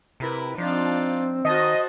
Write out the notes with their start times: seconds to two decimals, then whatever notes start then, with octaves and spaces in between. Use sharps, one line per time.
0.20 C3 E4 A#4 B4
0.58 F3 C4 D4 D#4 F4
1.45 D#3 F#4 C5 D#5 A5